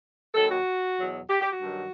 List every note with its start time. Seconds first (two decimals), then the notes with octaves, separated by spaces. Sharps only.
0.35 D#2 D#3 F#3 A4
0.50 F#4
0.98 E2 B2 F#3
1.30 G4
1.41 G4
1.51 F#4
1.62 G2 D#3 F#3